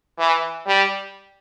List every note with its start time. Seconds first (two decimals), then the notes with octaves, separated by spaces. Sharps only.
0.18 E3
0.67 G3